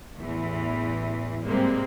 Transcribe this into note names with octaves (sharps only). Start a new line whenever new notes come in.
A1 E2 E3
G#2 C3 G3 G#3 A#3 C4